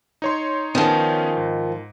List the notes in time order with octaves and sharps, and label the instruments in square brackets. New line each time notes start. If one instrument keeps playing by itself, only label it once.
[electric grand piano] D#4 C#5 C6
[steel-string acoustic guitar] D#3 F3 [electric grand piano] B3 C#4 G#4
[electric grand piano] G#2